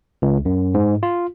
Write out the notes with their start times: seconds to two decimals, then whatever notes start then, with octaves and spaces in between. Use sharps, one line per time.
0.22 C#2
0.45 F#2
0.74 G#2
1.03 F4